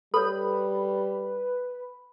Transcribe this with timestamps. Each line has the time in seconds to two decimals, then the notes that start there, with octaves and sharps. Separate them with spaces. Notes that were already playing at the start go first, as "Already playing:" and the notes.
0.14 G3 A4 B4 C#5 B5